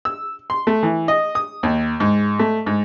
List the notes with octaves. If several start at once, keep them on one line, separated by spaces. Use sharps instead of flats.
E6
C6
A3
E3
D#5
D#6
D#2
G#2
A3
G#2